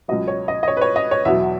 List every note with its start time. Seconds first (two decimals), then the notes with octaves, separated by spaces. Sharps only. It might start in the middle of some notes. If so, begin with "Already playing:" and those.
0.08 C#2 B2 F#3 D#5
0.28 C#5
0.48 D#5
0.63 D#5
0.68 C#5
0.77 B4
0.81 C#5
0.96 D#5
1.11 C#5
1.25 E2 B2 F#3 E5